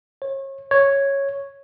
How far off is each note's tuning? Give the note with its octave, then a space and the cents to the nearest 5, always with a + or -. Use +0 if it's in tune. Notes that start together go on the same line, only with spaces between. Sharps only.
C#5 -35
C#5 -5